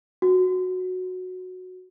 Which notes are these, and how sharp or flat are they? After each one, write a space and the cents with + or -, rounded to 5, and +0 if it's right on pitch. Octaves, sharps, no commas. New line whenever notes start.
F#4 -10